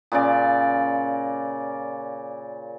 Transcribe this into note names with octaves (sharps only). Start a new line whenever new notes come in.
A#2 C#3 D5